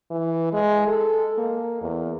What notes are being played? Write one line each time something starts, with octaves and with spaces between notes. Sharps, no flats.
E3
G#3
A4
A#3
E2